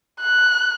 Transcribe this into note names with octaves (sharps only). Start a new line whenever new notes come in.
F#6